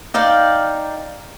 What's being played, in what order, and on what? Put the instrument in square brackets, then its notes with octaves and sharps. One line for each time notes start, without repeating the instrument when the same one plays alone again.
[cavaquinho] D#4 D5 F5 G5